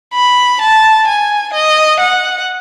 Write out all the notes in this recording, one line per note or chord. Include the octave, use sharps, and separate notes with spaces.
B5
A5
G#5
D#5
F#5